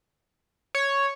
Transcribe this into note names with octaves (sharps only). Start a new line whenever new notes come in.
C#5